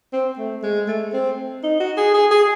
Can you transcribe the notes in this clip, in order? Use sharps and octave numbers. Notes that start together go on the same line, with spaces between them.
C4
A3
G#3
A3
C4
D#4
F#4
G#4
G#4
G#4